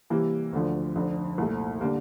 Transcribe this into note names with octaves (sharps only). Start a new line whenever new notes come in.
C3 E3 G3 A#3 E4
D2 D3 F3
F1 F2 D3
C2 A#2 A3
D3 G3 A#3